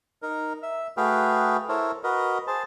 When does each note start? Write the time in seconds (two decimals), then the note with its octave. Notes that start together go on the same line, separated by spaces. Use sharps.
0.22 D#4 A#4
0.62 E5
0.97 A3 F#4 G#4 B4 F5 G5
1.69 E4 A4 A#4 C5 C#5
2.03 F#4 A#4 B4 D#5
2.47 G#4 C5 A5